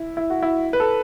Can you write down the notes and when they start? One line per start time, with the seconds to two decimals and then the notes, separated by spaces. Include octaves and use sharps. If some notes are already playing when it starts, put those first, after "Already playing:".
Already playing: E4
0.17 E4
0.30 F#4
0.42 E4
0.73 B4
0.80 A4